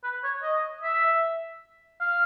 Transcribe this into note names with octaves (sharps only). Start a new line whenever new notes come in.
B4
C#5
D#5
E5
F5